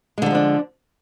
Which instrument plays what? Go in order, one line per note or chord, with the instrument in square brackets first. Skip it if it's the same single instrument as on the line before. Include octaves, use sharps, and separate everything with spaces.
[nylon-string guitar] G#3
D3
F#3
F3
D4